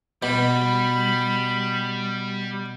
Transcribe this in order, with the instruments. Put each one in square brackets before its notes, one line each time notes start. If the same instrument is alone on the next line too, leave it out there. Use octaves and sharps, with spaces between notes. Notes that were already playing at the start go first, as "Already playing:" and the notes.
[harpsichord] B2 [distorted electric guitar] G3 [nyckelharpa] B5